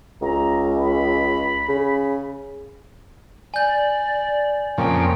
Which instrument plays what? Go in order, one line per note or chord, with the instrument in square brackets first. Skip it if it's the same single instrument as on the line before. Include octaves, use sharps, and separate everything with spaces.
[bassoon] C#2 [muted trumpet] A#5
[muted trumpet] B5
[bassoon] C#3
[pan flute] D5 [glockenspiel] G#5 G6
[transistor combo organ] F2 A#2 C#3 [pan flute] G5